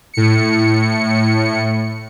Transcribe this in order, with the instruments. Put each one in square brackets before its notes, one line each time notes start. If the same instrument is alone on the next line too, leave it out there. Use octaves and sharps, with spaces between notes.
[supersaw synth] A2 C#7